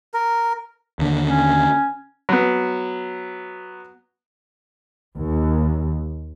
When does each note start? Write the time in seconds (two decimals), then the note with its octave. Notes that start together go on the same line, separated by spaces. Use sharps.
0.14 A#4
0.99 D#2 D3
1.29 C#4
2.29 F#3 B3
5.16 D#2